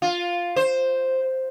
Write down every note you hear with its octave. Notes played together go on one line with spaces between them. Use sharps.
F4
C5